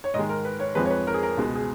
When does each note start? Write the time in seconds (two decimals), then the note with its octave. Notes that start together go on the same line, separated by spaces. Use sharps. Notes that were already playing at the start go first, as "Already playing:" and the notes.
0.04 C#5
0.14 G#2 D#5
0.17 D#3 G#3
0.29 A#4
0.45 B4
0.60 C#5
0.75 F2 F3 G#3 B4
0.85 C#5
0.91 B4
1.07 A#4
1.14 G#4
1.23 A#4
1.37 C#2 B2 G#3
1.55 G#4